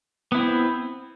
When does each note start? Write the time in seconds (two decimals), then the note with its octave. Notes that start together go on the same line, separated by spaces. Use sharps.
0.32 B3
0.35 E4
0.37 C4